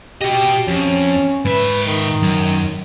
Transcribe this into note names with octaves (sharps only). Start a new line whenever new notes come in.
F#4 G4 D#5
F2 C#4
G#2 B4 E5
D#3
F#2